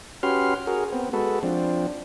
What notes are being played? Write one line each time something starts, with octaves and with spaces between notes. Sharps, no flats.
C#4 F#4 G4 B4 C6 F6
F#4 G#4 A#4
B3 C4
G#3 F#4 A4 B4
F3 C4 D4